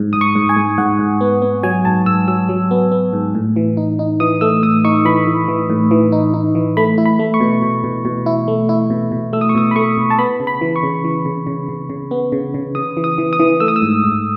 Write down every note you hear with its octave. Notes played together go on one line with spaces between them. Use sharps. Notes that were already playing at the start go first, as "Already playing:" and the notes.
Already playing: G#2
G#2 D#6
C#6
G#2
G#5
G#2
G#2 F#5
G#2
B3
B3
F#3 G#5
G#2 A5
G#2 E6
F#3 E6
F#3
B3
B3
G#2
A2
E3
D#4
D#4
E3 D#6
A3 E6
A2 D#6
D#4 C#6
E3 B5
E3
E3
A2
E3
D#4
D#4
E3
A3 B5
E4
B5
A3
C#6
B2
B2
B2
B2
E4
A3
E4
B2
B2
A3 E6
D#6
C#6
B2 D#6
B5
A3 C#6
B2
A5
B3 B5
C#3
B5
E3
C#6
C#3
E3
C#3
C#3
C#3
C#3
B3
C#3
C#3
C#3 D#6
E3
D#6
E3
D#6
E3
A3 E6
D#6
E6
G#2
G#2